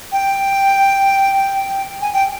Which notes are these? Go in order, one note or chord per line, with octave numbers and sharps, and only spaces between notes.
G5
G#5
G5